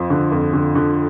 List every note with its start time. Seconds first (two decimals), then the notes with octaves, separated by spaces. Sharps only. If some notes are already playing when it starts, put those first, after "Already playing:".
Already playing: F2 F3
0.10 D3
0.32 F2
0.53 D3
0.75 D3